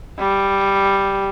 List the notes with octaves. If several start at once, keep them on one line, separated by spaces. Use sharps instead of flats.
G3